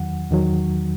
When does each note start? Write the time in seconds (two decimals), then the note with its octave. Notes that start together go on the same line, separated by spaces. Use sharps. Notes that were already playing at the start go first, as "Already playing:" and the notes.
Already playing: E2 D#3 F#3 F#5
0.31 E2 D#3 F#3